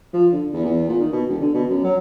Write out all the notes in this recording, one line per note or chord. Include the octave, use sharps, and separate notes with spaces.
F3
D3
E2
E2
A#2
D#3
B2
E1
D3
B2
F#2
F#3